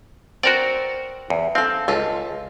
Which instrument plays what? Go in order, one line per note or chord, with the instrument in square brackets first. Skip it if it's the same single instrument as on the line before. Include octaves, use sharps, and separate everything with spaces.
[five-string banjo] C4 C5 [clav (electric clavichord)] F#4 A#4 D5
[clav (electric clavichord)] E2
[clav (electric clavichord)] C4 [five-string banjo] A4 F5
[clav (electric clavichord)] C#2 [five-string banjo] G#3 F4 A4